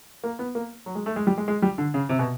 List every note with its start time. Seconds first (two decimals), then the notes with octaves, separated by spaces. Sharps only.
0.24 A#3
0.39 B3
0.55 A#3
0.86 F#3
0.95 G#3
1.06 A3
1.16 G#3
1.27 G3
1.38 G#3
1.48 G#3
1.62 G3
1.78 D3
1.94 C#3
2.09 C3
2.19 B2